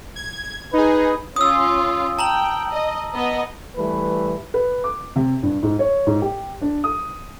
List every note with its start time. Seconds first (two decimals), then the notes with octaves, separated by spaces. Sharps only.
0.16 G#6
0.73 D#4 G#4 B4
1.36 C#4 F4 D#6 E6
2.19 G5 A5 A#5 F#7
2.71 D#5
3.14 B3 D#5
3.75 E3 G3 A3 B4
4.54 B4
4.84 D6
5.16 C3
5.43 G2
5.63 G#2
5.79 C#5
6.07 G#2
6.22 G4
6.61 D4
6.84 D#6